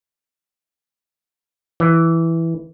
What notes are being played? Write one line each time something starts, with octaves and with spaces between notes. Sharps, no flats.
E3